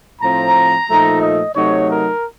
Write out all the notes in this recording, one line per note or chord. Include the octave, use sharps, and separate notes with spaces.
A2 F3 C4 A#5
A#2 F3 A3 D#4
D#5
C3 F#3 A3 D#4 C#5
A#4